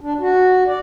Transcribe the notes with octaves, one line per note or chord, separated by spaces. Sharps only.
D4
F#4
D5